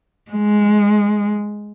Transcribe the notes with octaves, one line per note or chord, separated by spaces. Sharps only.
G#3